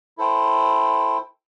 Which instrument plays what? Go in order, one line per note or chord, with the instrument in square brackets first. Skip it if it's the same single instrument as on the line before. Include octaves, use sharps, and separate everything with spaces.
[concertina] E4 A4 C5 G5